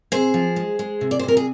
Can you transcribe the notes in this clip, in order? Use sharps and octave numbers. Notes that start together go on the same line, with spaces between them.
C3 G#4 C5
F3
G#3
G#3
C3
D5
C5
C3 A#4
G#4